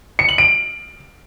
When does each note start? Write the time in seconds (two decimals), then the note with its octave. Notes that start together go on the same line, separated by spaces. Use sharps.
0.19 C#7
0.29 F#7
0.38 D7